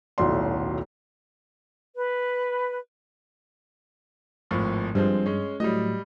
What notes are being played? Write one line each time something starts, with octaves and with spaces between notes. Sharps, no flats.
D#1 B1 A2 F#3 D5 C6
B4
G#1 A2 F3
G2 F3 G#3 C4
G#3 C#4
A2 F#3 G3 D#5